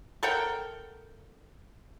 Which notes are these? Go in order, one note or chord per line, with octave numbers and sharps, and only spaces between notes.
A4 A#4 F#5 G5